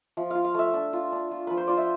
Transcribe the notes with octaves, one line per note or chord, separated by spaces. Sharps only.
F3 E5
F4 F5
F5
A3 E5
D4
F4
D4
F4
F3 B4
C5
F4 D5
E5